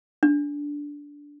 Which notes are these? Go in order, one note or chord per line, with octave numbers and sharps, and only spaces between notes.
D4